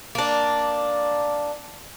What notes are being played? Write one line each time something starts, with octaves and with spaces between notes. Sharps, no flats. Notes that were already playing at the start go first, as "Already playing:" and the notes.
A#3 D4